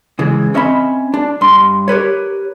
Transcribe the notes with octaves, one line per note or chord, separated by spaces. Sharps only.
C#3 E3 G#3
C4 C#4 D#5 E5 A5 B5
D4
G2 C6
G4 A#4 B4 C#5